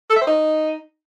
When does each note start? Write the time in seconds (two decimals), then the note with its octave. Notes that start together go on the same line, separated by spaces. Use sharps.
0.10 A4
0.16 E5
0.21 C5
0.27 D#4